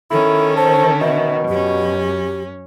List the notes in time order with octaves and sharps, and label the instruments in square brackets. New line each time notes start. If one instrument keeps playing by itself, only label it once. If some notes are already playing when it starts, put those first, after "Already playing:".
[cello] D#3 C#4 [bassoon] E4 [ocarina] A4
[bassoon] A4 [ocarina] C5
[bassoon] B2 [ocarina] E5
[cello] F#2 C#4 [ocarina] G4